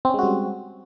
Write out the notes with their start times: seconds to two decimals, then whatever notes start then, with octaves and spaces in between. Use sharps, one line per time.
0.05 C4
0.09 C#4
0.14 G#3
0.19 F#4
0.23 G3